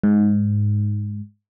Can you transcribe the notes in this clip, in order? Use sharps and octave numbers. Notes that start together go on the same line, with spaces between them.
G#2